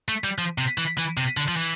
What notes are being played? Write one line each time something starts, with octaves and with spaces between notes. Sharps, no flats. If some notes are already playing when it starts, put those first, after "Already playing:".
A3
G3
F3
C3
E3
E3
C3
D3
F3
E3